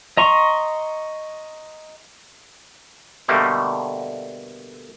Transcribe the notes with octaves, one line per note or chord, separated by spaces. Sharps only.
D#5 A#5 C6 C#6
B2 D3 G3 A3 A#3